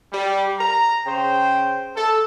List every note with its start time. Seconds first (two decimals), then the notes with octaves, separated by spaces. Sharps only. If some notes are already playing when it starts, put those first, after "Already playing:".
0.13 G3
0.59 A#5
1.06 C#3 C5 G5
1.95 A4